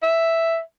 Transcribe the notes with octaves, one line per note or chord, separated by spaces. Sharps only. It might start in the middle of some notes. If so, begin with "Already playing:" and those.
E5